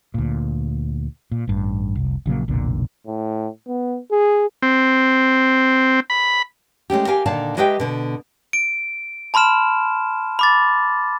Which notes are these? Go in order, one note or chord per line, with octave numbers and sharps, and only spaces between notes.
D2 A#2
A#2
A1 G2
F1 C2
A#1 C#3 F#3 A#3
F1 B1 A#2 D3
A2
B3
G#4
C4
B5
G#3 A3 C#4 G4
G4 A#4 F5 G#5
A#2 D3 D#3 D5 F5 A5
G#3 G4 B4 D#5 E5 G5
B2 D3
D7
A5 B5 C6 F6 E7
B5 D6 A6